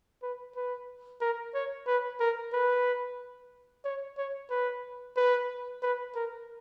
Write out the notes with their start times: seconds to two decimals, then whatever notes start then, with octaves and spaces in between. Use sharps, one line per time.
0.23 B4
0.56 B4
1.21 A#4
1.54 C#5
1.87 B4
2.20 A#4
2.53 B4
3.84 C#5
4.18 C#5
4.50 B4
5.16 B4
5.82 B4
6.15 A#4